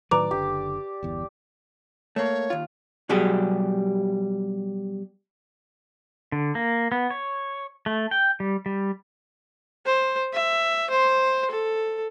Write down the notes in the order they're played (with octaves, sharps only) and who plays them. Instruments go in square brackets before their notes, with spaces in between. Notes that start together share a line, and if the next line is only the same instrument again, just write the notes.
[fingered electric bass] A2 D#3 F#3 [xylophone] B4 A#5 [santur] D5
[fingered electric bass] F#1 D3 [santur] G4
[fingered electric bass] G1 E2
[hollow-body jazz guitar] A3 A#3 [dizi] C#5
[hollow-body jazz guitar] D#2 F4
B2 F#3 G3 G4 G#4
[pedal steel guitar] D3
A#3
B3
C#5
A3
G5
G3
G3
[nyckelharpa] C5
E5
C5 C6
A4